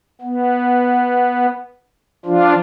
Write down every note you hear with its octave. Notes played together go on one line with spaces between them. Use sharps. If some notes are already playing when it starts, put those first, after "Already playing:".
B3
F3 D4 F4